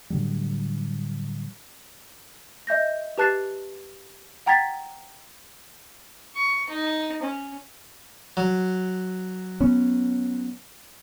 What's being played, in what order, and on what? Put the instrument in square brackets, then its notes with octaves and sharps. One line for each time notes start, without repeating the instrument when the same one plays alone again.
[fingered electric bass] A2 D3 F#3 G3
[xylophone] D#5 E5 G6 A#6
G4 B4 A5 F#6 A6 C7
F#5 G5 A#5 G#6 A6 B6
[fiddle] C#6
D#4
C#4
[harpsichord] F#3
[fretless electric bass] B3 C#4